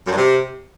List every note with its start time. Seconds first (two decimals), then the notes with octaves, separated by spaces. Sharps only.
0.06 F#2
0.11 G2
0.16 C3